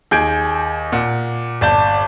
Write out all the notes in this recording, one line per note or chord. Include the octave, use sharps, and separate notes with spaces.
D#2 G#4 G6 G#6 D7
A#2 F#5
G1 D5 A5 G6